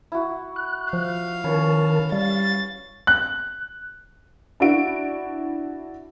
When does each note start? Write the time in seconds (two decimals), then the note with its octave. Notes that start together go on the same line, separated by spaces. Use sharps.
0.12 E4 F#4
0.56 F#6
0.93 F3 F5
1.44 D#3 C#4 A#4 B4 C#5 A5
2.12 G3 F5 A6
3.07 F#6
4.60 D4 E4 F#4 D7